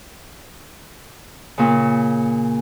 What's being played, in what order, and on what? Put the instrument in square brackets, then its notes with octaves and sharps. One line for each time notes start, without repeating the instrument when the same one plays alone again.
[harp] A#2 C#3